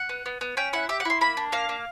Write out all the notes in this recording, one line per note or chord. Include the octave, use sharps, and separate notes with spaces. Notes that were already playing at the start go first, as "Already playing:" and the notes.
Already playing: F#5
B3
B3
B3
C#4 G5
E4 F#5
G4 E5
F#5
E4 C6
A#3 B5
D4
A#3 F5
A#3